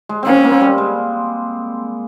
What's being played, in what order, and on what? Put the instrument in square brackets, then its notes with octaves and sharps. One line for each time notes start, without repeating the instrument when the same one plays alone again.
[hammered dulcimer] G#3
[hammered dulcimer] A#3 C4 [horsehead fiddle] C#4
[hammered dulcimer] A#3
G3
G#3